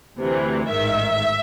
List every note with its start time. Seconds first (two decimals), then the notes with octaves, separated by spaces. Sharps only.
0.17 D2 C3 E3
0.68 A1 G#2 D#3 E5